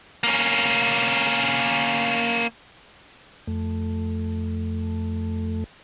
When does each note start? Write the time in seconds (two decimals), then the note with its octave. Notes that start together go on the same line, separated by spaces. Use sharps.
0.24 A#3 C#4
3.47 F2 A3